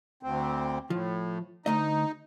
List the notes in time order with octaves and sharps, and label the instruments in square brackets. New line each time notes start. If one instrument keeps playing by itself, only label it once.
[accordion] D2 C4
[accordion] A2 [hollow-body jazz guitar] F3
[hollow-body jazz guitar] D2 A3 D#5 [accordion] D#4